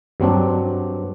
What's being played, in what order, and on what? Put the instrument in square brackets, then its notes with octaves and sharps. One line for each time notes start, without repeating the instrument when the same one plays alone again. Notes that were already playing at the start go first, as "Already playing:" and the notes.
[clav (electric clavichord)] G2 F#3 C4 D4